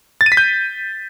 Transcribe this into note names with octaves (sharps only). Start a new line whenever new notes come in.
A6
D#7
B6
G6